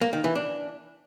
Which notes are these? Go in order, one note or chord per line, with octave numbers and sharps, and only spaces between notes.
A#3
D#3
E3
D4